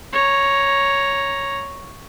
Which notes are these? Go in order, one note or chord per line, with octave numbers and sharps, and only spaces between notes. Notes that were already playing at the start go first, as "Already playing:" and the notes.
C#5 A#5